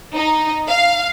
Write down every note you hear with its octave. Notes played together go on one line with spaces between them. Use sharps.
D#4
F5